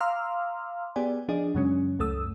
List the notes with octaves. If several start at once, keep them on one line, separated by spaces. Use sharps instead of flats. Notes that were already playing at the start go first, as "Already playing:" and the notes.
F5 A#5 C6 D6 E6 F6
B3 G4 G#4 D5 G#5
F3 D4 G#4 D5 D#5
F#2 C#3 F#3 G#3 C#4
C#2 F#2 A3 A4 D#6 E6